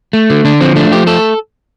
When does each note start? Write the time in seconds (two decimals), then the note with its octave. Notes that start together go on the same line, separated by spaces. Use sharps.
0.13 A3
0.30 D3
0.44 D3 D4
0.61 F3 C4
0.76 A3 D4
0.91 F3 G4
1.06 A3 A4